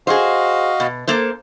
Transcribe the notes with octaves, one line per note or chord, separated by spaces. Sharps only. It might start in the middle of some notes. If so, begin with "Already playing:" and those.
F#4 G#4 C5 D#5 F5
B2
A#3 A4 C5